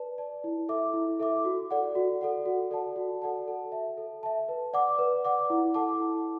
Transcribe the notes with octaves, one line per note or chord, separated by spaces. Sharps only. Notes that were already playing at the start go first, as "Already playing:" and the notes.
Already playing: B4 D5 A5
D5 A5
E4
A4 E5 D6
E4
A4 E5 D6
F#4
A4 D5 F#5
F#4
A4 D5 F#5
F#4
A4 D5 F#5 A5
F#4
A4 D5 F#5 A5
A4
E5 A5
A4
E5 A5
B4
D5 F#5 D6
B4
D5 F#5 D6
E4
A4 F#5 A5 D6
E4